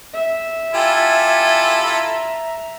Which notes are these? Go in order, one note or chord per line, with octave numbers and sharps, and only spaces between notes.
E5
E4 F4 G4 A4 G#5
A#5